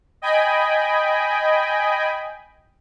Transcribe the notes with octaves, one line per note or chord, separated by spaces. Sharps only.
D#5 G5 G#5 B5